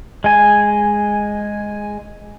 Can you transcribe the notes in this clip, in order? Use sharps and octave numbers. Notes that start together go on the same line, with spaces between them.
G#3 G#5